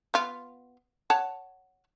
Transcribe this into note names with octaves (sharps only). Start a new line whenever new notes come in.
B3 F4
C#5 F#5 A5